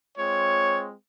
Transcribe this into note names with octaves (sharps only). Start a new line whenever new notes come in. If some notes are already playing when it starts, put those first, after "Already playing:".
G#3 C4 F4 C#5